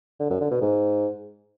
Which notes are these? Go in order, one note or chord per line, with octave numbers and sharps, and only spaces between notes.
D3
F#2
D3
B2
G#2